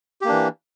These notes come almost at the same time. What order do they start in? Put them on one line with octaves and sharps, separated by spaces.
G4 A#3 D4 E3